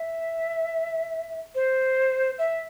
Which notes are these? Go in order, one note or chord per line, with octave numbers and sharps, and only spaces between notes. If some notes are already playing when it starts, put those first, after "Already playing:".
Already playing: E5
C5
E5